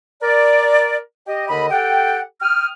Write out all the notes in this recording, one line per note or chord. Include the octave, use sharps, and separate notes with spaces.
A#4 D5
G4 D#5
D#2 D3 D#5 B5
G4 A4 F#5 G5
G5 D#6 F6